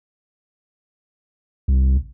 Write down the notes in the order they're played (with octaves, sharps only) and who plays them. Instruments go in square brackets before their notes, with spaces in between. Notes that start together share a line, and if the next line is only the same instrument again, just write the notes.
[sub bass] C2